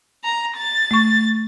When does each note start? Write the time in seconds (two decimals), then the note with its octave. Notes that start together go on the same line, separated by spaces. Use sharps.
0.24 A#5
0.57 A6
0.91 A3 C#6